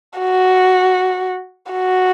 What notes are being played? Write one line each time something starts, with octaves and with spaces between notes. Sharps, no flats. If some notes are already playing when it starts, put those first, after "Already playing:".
F#4
F#4